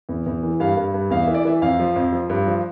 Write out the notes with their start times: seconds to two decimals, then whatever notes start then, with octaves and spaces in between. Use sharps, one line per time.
0.09 E2
0.26 E2
0.43 E3
0.60 G2 F5
0.76 G2
0.94 G2
1.10 E2 F5
1.23 E3 E5
1.34 D5
1.45 E3 E5
1.62 F2 F5
1.79 F3
1.96 F2
2.12 F3
2.30 G2
2.47 F3